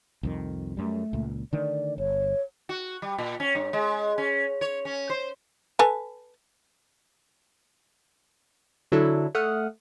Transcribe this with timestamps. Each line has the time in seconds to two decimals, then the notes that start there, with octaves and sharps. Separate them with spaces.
0.23 C2 F2 D#3
0.77 F#2 G3 A3
1.13 C#2 A#2
1.53 D3 D#3 A3 D5
1.98 G1 C#5
2.69 F#4
3.02 G3
3.18 A#2
3.40 C#4
3.55 G2
3.73 G#3
4.18 C#4
4.61 C#5
4.85 C#4
5.10 C5
5.79 A4 B4 G#5
8.92 D3 F#3 D4 E4 A4
9.35 A3 F#5 D#6 F6